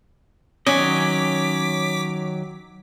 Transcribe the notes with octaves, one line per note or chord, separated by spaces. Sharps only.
D#3 F#3 C#4 D#5 D6 B6